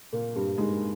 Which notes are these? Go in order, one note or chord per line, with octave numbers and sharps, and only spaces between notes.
A#2 A#3
G2 G3
G#2 G#3